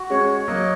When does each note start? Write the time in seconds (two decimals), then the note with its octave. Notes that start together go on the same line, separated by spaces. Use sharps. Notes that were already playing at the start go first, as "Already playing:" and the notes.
Already playing: F#4
0.10 G#3 C#4 C#5
0.29 C#5
0.48 F#3 A#3 D#5